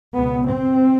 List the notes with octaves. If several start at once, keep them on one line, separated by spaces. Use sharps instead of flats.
C#2 B2 B3
C4